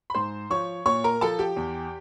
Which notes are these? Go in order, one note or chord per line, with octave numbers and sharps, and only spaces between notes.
B5
G#2 C5 C6
F3 C#5 C#6
A#2 C#5 C#6
A#4 A#5
F3 A4 A5
G4 G5
E2